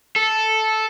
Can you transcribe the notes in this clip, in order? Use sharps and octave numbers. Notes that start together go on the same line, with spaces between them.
A4